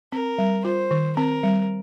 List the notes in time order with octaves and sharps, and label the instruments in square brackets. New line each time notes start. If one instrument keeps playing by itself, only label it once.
[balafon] C4 [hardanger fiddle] A#4
[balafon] G3
[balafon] F4 [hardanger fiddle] C5
[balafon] D#3
[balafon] C4 [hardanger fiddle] A#4
[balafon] G3